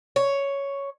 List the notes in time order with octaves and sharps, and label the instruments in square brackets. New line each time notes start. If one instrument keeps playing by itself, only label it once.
[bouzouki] C#5